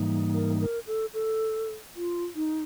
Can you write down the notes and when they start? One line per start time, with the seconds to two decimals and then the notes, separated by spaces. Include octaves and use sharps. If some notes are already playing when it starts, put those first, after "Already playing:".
Already playing: G#2 E3 G3 A#3 D#4
0.34 A#4
0.60 A#4
0.87 A4
1.14 A4
1.96 F4
2.35 D#4